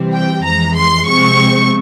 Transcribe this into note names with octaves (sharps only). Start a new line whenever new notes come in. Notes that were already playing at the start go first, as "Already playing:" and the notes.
Already playing: C3 E3 G3 C4
G5
F2 E3 G#3 A#5
C6
C3 F3 G#3 C4 C#6